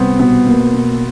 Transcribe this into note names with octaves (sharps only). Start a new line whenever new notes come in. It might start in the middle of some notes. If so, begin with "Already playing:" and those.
Already playing: C2 B3 C4
B2 B3
A#3
B2